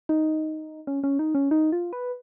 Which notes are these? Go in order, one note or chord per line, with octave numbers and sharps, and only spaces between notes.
D#4
C#4
C#4
D#4
C#4
D#4
F4
B4